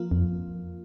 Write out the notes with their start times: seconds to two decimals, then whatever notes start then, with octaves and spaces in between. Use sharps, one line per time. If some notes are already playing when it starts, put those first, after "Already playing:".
Already playing: F3 A#3 F4
0.11 F2